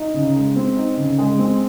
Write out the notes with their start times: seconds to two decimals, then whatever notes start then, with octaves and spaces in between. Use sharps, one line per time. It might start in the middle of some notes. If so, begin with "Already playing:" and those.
Already playing: D#4
0.14 C#3
0.36 G#3
0.56 C4
0.77 D#4
0.97 C#3
1.18 G#3
1.39 C4